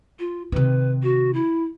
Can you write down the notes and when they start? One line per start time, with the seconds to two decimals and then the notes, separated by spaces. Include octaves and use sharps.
0.19 F4
0.52 C3 D#3 B4
1.03 F#4
1.34 E4